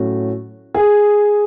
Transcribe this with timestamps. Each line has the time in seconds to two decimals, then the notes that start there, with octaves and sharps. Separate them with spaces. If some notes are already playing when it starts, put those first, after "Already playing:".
Already playing: A2 F#3 A3 C#4 F#4
0.74 G#4